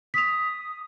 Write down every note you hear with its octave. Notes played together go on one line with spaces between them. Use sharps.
D#6 B6 F7